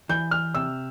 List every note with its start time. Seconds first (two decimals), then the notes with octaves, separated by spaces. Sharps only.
0.09 E3 G6
0.31 F6
0.54 C3 E6